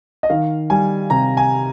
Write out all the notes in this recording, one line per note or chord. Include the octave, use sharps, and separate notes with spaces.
D#5
D#3 F5
G3 G#5
C3 A#5
G#5